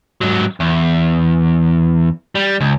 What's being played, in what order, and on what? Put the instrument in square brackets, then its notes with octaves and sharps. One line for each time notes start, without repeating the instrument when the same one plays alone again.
[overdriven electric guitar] G#2 F#3
E2
G3
C#2